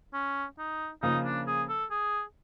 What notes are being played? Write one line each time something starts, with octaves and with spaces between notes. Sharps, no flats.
C#4
D#4
C#3 F3 A#3 D#4
D4
G#4
A4
G#4